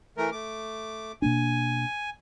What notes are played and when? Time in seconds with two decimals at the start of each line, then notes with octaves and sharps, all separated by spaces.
0.18 E3 A3 A#4
0.32 A3 D6
1.22 B2 A#3 D4 G#5